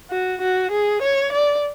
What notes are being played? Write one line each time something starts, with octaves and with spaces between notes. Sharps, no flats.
F#4
F#4
G#4
C#5
D5